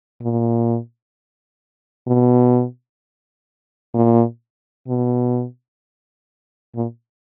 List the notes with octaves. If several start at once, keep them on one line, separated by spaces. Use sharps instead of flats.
A#2
B2
A#2
B2
A#2